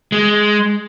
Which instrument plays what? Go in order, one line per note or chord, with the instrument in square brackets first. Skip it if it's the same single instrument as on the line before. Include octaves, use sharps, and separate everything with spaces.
[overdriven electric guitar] G#3